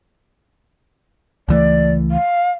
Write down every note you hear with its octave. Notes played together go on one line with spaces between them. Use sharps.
C#2 E3 A3 D5
F5